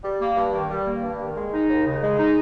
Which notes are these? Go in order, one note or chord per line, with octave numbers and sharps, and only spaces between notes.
G3
A#3
G2
D#3
G3
A#3
G2
D#3
G#3
D#4
D#2
C#3
G#3
D#4